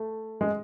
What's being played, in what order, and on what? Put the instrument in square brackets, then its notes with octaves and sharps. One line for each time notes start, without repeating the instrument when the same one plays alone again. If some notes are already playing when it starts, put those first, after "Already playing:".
Already playing: [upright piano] A3
G#3